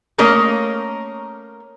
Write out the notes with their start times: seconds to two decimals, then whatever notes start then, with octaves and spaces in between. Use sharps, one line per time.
0.18 A3 A#3 C#4 A#4 D#5